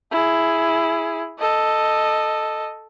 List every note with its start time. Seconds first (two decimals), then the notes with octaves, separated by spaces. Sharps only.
0.11 E4 G#4
1.39 A4 D#5